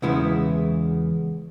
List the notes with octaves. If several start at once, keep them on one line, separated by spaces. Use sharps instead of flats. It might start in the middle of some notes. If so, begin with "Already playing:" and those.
E2 C#3 G#3 B3 E4